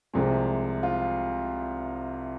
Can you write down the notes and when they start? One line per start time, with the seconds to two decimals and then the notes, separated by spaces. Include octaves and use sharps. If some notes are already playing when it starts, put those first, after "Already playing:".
0.14 C2 C3 F3 G#3
0.83 F4